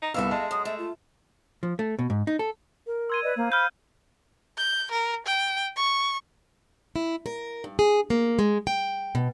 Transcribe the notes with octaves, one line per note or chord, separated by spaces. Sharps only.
D#4
C2 D#3 B3 A4 E5 F5 E6
G#3 D#5 A5
F#2 D#6
A3 E5
F4
F3
A3
B2
G#2
D#4
A4
A#4
C6 E6 G#6 D#7
B4 D5 D#5
A#3 C5 F5
B5 F6 G6
G6
A#4
G5
C#6
E4
A#4
G2
G#4
A#3
G#3
G5
B2